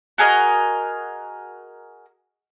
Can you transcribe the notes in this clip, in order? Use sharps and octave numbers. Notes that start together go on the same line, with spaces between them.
F#4 G#4 A#4 D#5